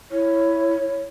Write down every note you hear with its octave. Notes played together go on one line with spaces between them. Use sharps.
E4 C#5